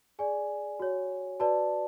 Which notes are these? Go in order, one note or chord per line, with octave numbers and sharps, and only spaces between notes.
G#4 D5 G#5
F#4 C#5
F#4 B4 D5 A5